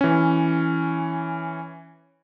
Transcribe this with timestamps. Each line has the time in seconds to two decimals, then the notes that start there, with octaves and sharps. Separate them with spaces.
0.01 E3 C#4